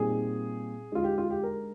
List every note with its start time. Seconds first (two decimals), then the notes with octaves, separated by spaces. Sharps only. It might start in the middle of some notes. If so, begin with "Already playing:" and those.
Already playing: A#2 G3 C4 D#4 G#4
0.92 D3 G#3 D#4 F4
1.04 G4
1.18 F4
1.30 G4
1.43 A#4